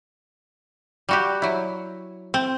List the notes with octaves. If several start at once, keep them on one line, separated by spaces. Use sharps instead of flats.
G3 F#4 G4
F#3 E4
C4